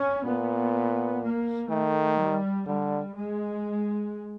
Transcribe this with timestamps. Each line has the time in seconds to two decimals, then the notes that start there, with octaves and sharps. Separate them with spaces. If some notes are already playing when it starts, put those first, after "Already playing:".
Already playing: C#4
0.25 A#2 B3
1.22 A#3
1.70 D#3 A3
2.19 G3
2.67 D3 G3
3.15 G#3